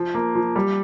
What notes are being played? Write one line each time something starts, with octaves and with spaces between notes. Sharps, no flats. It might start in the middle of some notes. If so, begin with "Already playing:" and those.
Already playing: F3
A#3
F3
G3